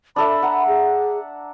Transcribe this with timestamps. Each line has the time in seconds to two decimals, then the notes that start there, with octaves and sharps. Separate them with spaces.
0.16 D4 A4 E5 B5
0.42 F#5 A#5
0.68 G#4